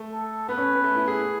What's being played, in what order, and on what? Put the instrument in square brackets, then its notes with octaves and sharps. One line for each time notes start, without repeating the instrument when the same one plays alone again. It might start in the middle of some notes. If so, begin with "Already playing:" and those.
Already playing: [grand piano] A3
[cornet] A4
[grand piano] B3 [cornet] B4
[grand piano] C#4
B3
A3
E4
G#4